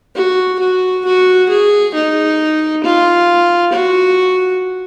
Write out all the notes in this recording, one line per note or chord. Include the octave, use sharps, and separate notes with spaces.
F#4
F#4
F#4
G#4
D#4
F4
F#4